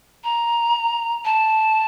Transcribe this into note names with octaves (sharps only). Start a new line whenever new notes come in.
A#5
A5